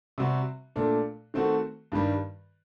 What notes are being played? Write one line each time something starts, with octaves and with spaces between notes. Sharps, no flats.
C3 G3 C4 F#4
A#2 A3 D4
D#3 A3 C4 F#4
G2 D#3 G3